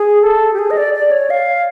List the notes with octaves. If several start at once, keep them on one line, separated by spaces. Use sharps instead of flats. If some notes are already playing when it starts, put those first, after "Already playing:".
Already playing: G#4
A4
G4
G#4
D#5
D5
D5
C#5
F5